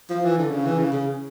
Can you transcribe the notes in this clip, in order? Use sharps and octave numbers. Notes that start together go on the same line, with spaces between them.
F3
E3
D3
C#3
E3
C#3
C#3